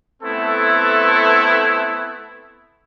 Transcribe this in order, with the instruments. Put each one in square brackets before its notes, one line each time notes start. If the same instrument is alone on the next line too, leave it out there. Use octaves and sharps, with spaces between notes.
[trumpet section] A3 B3 C4 E4 A4